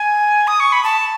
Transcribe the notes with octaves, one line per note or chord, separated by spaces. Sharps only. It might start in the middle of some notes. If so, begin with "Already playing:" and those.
Already playing: G#5
D#6
C#6
B5
A5